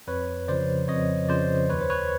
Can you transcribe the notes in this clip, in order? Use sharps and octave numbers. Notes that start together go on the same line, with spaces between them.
F2 B4 C#5
C#3 F3 C5 D5
F2 C#5 D#5
C#3 F3 C5 D5
D#2 B4 C#5
C5
B4 C#5